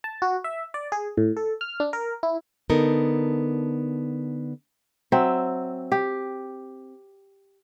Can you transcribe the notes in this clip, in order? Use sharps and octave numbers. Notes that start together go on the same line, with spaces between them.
A5
F#4
E5
D5
G#4
A2
A4
F6
D4
A#4
E4
D3 B3 D#4 A4 A#4
F#3 C4 E5
G4